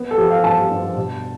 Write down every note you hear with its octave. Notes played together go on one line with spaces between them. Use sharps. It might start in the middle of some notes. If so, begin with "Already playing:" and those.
Already playing: B3
A4
F3 G4
F5
G2 A5
G2
B2